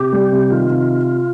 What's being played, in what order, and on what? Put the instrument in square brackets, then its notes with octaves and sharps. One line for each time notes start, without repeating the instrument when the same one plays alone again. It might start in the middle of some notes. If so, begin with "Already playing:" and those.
Already playing: [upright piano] C3 [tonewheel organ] G4
[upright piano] G3
C3
[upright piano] D#3 [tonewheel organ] F4
[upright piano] C3